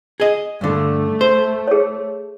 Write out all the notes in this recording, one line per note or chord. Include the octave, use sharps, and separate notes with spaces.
G#4 D#5
G2 D3 A3
C5
G#4 C#5